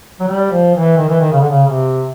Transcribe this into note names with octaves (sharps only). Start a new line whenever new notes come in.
F#3
G3
F3
E3
D#3
E3
D#3
C#3
D3
C#3
C3